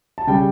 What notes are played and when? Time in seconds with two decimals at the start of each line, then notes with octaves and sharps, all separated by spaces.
0.18 A5
0.27 C#3 G3 G5